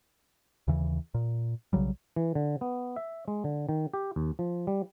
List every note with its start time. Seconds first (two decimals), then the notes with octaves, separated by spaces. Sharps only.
0.68 D#2 C#3 E3
1.14 A#2
1.73 B1 C#3 F#3 G3
2.16 E3
2.35 D3
2.61 B3
2.96 E5
3.28 G#3
3.44 D3
3.69 D#3
3.93 G4
4.16 D#2
4.39 F3
4.67 G3